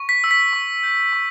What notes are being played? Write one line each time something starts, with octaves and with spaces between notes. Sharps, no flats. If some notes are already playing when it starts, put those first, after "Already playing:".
Already playing: C#6
B6
E6
B6
C#6
G6
C#6